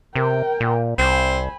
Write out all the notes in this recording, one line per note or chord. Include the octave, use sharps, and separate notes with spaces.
C3 A#4 G5
A#2
C2 C4 G#5 B5